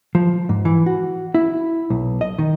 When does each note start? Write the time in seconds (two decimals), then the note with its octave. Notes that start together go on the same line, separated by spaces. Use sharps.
0.15 F3
0.49 G#2
0.65 E3
0.86 F#4
1.34 E4
1.90 B1
2.21 D#5
2.39 D#3